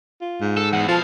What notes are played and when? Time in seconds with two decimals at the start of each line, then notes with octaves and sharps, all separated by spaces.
0.21 F4
0.41 G#2
0.57 A4
0.73 E2 F#5
0.88 B2 F3 F5 A5